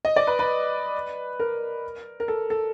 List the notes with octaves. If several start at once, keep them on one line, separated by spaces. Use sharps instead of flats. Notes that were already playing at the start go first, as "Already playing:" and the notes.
D#5
D5
B4
B4
A#4
A#4
A4
A4